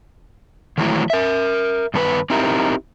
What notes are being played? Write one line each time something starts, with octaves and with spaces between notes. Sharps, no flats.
D#3 E3 F#3 G#3 A3 E4
A#4 E5
G2 D#3 B3 G#4 B4
C4 D#4 E4 G4 A#4